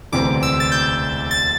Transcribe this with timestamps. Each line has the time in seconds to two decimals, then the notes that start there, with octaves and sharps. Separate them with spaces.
0.12 E1 D2 C3 E3 C4 D6
0.43 E6
0.60 A6
0.72 G6
1.31 A6